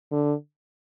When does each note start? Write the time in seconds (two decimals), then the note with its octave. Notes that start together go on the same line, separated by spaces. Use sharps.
0.12 D3